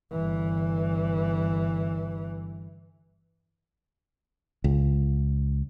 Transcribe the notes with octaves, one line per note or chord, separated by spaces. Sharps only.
G1 E3
C#2